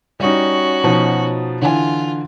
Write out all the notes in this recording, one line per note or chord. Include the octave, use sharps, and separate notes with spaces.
G3 C#4 D#4 F#4
B2 F3 D#4
D3 E3 F4 G#5